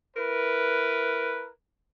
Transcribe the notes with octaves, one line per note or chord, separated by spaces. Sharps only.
E4 A#4 B4